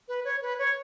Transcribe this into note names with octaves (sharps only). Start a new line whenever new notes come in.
B4
C#5
B4
C#5